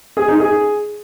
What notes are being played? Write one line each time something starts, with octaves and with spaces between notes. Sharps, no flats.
G#4
D#4
G#4